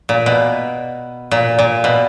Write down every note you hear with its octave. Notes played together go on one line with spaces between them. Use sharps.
A#2
B2
A#2
A#2
B2